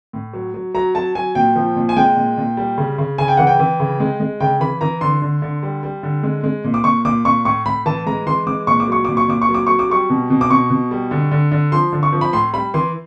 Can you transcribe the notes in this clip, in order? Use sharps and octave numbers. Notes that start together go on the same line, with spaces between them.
A2
F#3
F#3
F#3 A#5
F#3 A5
F#3 G#5
A#2 G5
F3
A#2
G#5
G#3 G5
A#2
A#2
G3
C#3
C#3
C#3 G#5
G5
E3 F#5
G5
E3
C#3
G#3
G#3
C#3 G5
E3 B5
E3 A#5
D3 C6
D3
D3
G3
G3
D3
G#3
G#3
A#2
D6
A#2 C#6
A#2 D6
A#2 C#6
A2 C#6
A2 B5
E3 A5
G#3 A#5
E3 C6
G#3 D6
A#2 C#6
D6
F#3 C#6
A#2 D6
C#6
A#2 D6
C#6
F#3
D6
F#3 C#6
D6
G3 C#6
B2
B2
D6
B2 C#6
B2
G3
D3
D3
D3
F3 C6
D3
C#6
F3
B5
A2 C6
G3 B5
E3 C6